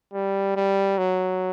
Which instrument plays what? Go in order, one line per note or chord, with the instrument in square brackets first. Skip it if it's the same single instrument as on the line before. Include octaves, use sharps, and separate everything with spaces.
[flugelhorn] G3
G3
F#3